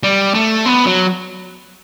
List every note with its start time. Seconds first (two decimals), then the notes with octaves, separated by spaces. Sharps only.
0.03 G3
0.34 A3
0.66 B3
0.87 F#3